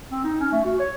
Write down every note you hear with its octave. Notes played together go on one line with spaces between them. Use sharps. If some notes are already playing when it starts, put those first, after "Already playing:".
C4
D#4
C#4
A3
F#4
C#5